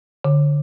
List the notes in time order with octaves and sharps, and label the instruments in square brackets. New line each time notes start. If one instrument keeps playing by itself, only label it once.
[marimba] D3